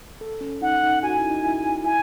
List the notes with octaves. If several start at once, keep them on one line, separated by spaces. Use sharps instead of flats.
A4
C#4
D#4 F#5
D#4
F#4 G#5
E4
D#4
E4
E4 G#5